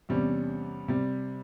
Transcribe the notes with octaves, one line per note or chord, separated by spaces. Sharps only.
E2 C3 G3 C#4
C3 G3